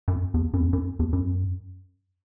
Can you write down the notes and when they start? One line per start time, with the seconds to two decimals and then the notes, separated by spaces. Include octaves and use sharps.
0.08 F#2
0.34 E2
0.54 F#2
0.60 E2
0.73 F#2
0.99 E2
1.13 F#2